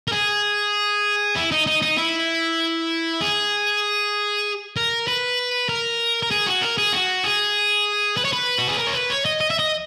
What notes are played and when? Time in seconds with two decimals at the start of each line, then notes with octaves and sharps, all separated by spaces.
0.08 A#4
0.12 G#4
1.36 E4
1.51 D#4
1.67 D#4
1.82 D#4
1.98 E4
3.21 G#4
4.76 A#4
5.08 B4
5.69 A#4
6.23 A#4
6.31 G#4
6.47 F#4
6.62 A#4
6.78 G#4
6.93 F#4
7.24 G#4
8.17 B4
8.25 C#5
8.33 B4
8.58 F#4
8.69 G#4
8.78 A#4
8.87 C#5
8.94 B4
9.10 C#5
9.25 D#5
9.41 D#5
9.50 E5
9.59 D#5